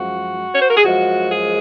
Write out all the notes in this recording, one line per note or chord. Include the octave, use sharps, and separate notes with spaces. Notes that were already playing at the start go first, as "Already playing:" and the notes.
Already playing: F#2 F3 G#3 F#4
C#5
C5
A#4
G#4
F#2 F3 G#3 F#4
G#4